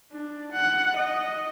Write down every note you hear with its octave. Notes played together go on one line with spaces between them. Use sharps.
D4
F#5
D#5